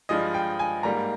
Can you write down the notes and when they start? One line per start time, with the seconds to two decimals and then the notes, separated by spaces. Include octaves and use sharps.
0.09 G2 F3 G#3 D#5
0.34 G5
0.59 G#5
0.83 G#2 G3 A#3 A#5